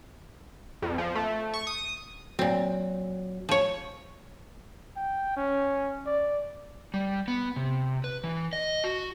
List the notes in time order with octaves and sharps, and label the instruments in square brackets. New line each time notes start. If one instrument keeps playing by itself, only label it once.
[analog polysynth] F2
F3
A3
C#6
D#6
[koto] A#2 C4 [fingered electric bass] F#3
[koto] F3 C#5
[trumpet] G5
C#4
D5
[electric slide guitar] G3
B3
C3
B4
E3
D#5
F#4